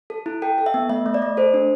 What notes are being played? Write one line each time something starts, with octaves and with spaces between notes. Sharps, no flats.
A4
E4
A4 G5
A4
E5
B3
A3 E5
A3
D5
A3
A4 C5
D4